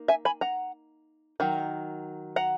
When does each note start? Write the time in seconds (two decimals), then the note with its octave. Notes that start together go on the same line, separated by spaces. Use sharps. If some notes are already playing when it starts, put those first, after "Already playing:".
Already playing: A#3 D#4
0.08 E5 G#5
0.25 G#5 B5
0.41 F#5 A#5
1.40 D#3 F#3
2.36 F#5 A#5